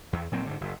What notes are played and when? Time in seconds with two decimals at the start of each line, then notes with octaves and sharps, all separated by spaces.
0.13 E2
0.32 A#2 F#3 C4
0.46 G#2 D3
0.61 F#1